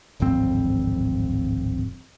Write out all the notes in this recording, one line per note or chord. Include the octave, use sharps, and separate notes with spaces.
D1 G#1 F2 C4